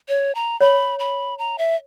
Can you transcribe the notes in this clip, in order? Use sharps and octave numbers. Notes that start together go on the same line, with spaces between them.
C#5
A#5
C#5 B5
B5
A#5
E5